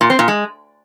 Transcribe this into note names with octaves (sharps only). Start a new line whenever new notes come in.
A#2
C4
A#2
G#3